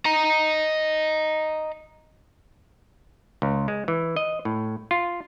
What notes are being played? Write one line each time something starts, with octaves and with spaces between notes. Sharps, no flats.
D#5 A#5
C#2
G#3
E3
D#5
A2
F4